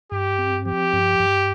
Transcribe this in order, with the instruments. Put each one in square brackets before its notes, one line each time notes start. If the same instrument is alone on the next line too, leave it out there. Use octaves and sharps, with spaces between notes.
[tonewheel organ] G2 [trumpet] G4
[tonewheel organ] C4
[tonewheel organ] F3 [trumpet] G4
[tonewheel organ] G2
G2